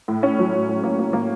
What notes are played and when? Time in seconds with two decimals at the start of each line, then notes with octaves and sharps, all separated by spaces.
0.08 A2
0.23 C#4
0.39 F#3
0.54 A2
0.69 A2
0.83 A#3
0.99 A#3
1.13 A#3